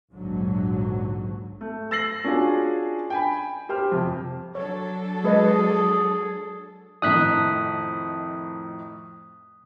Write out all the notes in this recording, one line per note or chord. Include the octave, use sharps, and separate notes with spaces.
A#1 D#2 G#2 D3 F#3
A3
E6 A6 A#6 C7 F#7
C#4 D4 F4 F#4 G#4
G5 G#5 B5
G4 C5 G5 C6 F6
F2 C3
F#3 D4 A4 C#5
G#3 G#4 B4 D#5
F2 A2 D#3 D#6 F#6 B6